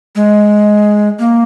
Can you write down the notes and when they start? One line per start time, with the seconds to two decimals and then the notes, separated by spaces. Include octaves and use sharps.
0.16 G#3
1.19 A#3